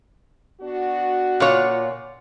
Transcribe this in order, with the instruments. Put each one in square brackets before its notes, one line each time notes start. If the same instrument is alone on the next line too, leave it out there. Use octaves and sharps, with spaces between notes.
[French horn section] B3 D4 F#4
[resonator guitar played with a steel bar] A#2 C#5 [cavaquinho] F4 D5 F#5